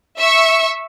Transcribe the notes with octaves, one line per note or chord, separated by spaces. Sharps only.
E5 C#6